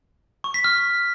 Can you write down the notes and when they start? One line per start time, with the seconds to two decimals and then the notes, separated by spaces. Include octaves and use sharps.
0.44 C#6
0.54 B6
0.64 F6